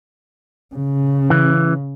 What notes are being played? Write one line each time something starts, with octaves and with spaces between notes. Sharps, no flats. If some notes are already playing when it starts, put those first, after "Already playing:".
C#3
E3